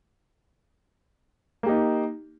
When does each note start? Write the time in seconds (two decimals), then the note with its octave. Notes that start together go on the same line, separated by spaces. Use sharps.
1.63 A#3
1.66 G4
1.69 D#4